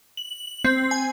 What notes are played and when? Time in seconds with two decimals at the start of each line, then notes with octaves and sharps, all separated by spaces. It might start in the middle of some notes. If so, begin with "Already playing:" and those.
0.17 F#7
0.64 C4
0.91 G#5